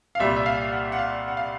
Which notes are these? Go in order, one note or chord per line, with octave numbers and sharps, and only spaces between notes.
F5
C2 A#2 G3 E5
E5
F5
F#5
F#5
F5
F#5
F5